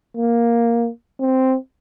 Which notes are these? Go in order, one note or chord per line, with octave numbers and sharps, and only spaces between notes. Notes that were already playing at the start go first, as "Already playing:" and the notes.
A#3
C4